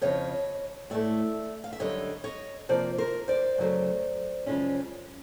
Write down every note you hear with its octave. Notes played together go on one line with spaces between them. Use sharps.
F2 C#3 F3 C#5 D#5
A2 E3 A3 D5 E5
F5
E5
F#2 D3 G3 C#5 D#5
C#5 D#5
C3 F3 A#3 C5 D5
A#4 C5
C5 D5
F#2 C#3 F#3 A3
F#2 C#3 F3 G#3 C#4